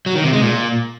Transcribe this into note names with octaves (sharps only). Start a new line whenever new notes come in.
F#3
D#3
C3
G#3
A#2